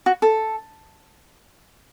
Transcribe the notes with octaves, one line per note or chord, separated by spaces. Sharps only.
F#4
A4